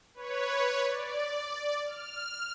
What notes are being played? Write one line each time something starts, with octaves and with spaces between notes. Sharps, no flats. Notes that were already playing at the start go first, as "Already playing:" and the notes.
B4 C#5
D5
F6